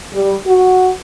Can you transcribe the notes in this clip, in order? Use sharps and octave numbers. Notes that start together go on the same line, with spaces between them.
G3
F#4